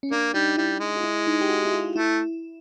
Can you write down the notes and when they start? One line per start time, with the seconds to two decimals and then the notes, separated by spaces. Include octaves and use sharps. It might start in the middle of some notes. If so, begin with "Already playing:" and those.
0.03 C#4
0.11 A#3 D4
0.34 G3 D#4
0.57 G3 E4
0.80 G#3
0.97 F4
1.04 E4
1.27 D#4
1.41 G4
1.49 F#4
1.65 E4
1.73 F4
1.96 A3 E4